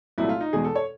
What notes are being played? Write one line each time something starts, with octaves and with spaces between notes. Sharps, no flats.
C2 A#2 F#3 A3 E4
F4
D#4
E2 B2 G#3 G#4
A4
C#5